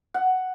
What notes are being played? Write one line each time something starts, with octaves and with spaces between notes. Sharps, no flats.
F#5